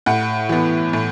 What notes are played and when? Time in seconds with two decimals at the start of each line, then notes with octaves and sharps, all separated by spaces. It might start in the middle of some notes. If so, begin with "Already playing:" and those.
0.06 A2 F#5
0.49 E3 B3
0.93 A2